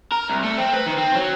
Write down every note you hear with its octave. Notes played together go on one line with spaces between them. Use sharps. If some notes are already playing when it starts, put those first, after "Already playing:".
A#4
C2
A3
C4
B4
D#3
C4
F#3